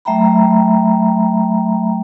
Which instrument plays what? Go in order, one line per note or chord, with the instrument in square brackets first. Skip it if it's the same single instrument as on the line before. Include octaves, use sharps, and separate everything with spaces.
[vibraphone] F#3 A3 E5 G5 A#5 B5